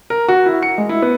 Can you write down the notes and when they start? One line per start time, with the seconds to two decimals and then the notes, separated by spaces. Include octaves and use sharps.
0.10 A#4
0.28 F#4
0.46 E4
0.63 C#7
0.78 G#3
0.89 E4
1.02 B3